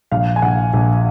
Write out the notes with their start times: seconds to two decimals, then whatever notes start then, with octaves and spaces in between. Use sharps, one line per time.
0.11 A#1 F5
0.36 G#5
0.42 A#1 F#5
0.73 A#1